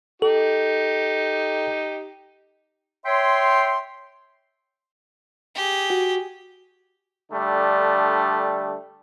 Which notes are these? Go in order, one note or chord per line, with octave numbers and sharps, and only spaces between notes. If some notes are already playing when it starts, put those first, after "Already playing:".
D#4 G4 A4
C#5 E5 G5 C6
G4 G#4
F#4
D3 G3 A3 D4